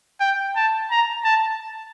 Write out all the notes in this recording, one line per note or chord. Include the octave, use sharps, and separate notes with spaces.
G5
A5
A#5
A5